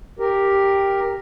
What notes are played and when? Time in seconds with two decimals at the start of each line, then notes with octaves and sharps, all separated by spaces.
0.19 G4 A#4